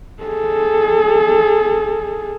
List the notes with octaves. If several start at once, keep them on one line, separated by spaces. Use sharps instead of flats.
G#4 A4